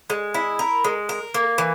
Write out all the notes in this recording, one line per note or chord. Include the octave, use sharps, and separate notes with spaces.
G#3
E4
A#4
G#3
A#4
A#3
E3